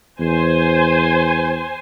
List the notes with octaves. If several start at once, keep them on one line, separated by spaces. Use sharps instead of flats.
E2 C5 G#5